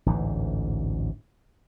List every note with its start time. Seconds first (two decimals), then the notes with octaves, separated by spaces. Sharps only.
0.06 A1 D2 G#2 E3